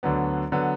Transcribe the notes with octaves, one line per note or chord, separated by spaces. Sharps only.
D2 D3 F#3 B3
D3 F#3 B3